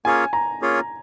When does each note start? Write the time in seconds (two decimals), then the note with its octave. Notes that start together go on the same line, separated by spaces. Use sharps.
0.05 A#3 C#4 F4 G#4 C#5 G#5
0.33 A#5
0.61 A#3 C#4 F4 G#4 C#5